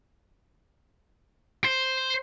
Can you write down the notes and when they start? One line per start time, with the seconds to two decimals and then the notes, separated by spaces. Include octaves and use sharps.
1.64 C5